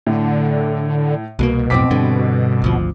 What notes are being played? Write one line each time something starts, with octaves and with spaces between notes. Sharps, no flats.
A2 D3
C2 B2 G#3 A#3
B1 F2 A2 C4 D6 B6
G2 D3
G#1 D2 F3